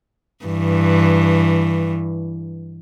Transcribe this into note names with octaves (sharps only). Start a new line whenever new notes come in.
G2 E3